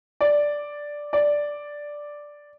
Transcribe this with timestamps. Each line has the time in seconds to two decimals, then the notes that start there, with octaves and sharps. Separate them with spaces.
0.21 D5
1.13 D5